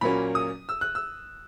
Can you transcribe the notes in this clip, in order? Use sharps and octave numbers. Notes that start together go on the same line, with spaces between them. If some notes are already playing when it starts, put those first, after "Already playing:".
A#2 F#3 A#3 C#4 B5
D#6
E6
F#6
E6